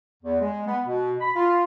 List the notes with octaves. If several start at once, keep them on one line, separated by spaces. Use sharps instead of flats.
E2
G#3
B3
B2
B5
F4